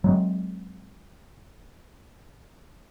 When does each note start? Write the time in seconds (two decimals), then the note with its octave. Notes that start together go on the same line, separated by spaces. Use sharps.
0.04 F#3 G#3 C4